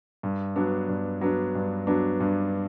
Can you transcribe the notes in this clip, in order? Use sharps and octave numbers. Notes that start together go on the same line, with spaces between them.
G2
F#3 B3 D4
G2
F#3 B3 D4
G2
F#3 B3 D4
G2